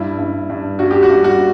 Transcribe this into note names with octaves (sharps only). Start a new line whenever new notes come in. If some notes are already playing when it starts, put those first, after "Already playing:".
Already playing: G2 E4
G2
G2
G2 F#4
G4
F#4
G2
F#4